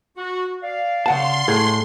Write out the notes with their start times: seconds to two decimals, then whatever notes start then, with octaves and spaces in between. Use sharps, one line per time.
0.17 F#4
0.63 D5 F5
1.06 C#3 F#5 A5 C6
1.48 A2 G#4